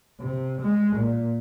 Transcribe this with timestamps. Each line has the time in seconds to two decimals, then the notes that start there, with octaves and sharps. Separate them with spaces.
0.20 C3
0.61 G#3
0.96 A#2